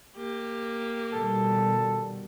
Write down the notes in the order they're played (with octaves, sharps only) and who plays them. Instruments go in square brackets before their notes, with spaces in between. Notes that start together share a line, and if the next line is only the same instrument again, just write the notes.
[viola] A#3 G4
[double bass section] B2 D#3 G3 [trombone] A4